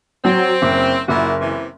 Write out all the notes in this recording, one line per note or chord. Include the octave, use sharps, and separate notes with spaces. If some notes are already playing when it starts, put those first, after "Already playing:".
F#3 C4
F#1
F#1 A#2 E4 F#4
C3 E3